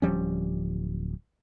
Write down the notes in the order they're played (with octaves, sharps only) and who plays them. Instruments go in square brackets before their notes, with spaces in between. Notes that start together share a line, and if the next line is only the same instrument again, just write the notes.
[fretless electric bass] D1 F3 G3 C#4